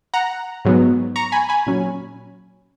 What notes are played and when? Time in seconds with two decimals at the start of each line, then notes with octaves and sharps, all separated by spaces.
0.14 F#5 A#5
0.65 G#2 F#3 B3
1.16 A#5 C#6
1.32 G#5 B5
1.49 G#5 B5
1.66 A#2 F#3 C#4